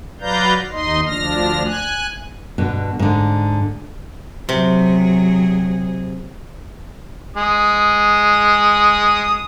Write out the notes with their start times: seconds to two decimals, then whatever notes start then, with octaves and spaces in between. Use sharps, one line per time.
0.21 F#3 B4 D5 F5 A#5 G6
0.71 D#2 D#4 D#5 C6
1.07 D2 F3 D4 F6 A#6
1.65 G#5 F#6
2.58 G2 B2 D3
2.99 G#2 D3
4.49 C3 F#3 G#4
7.36 G#3 D#6